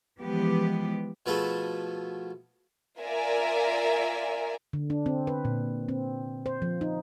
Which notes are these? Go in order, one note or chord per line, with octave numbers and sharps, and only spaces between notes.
E3 F3 G#3 B3 G4
B2 F3 A3 B3 G#4 A4
F4 A#4 D5 E5 G#5 A#5
D3
D4
C4
B4
A#2
C4
C5
F3
D#4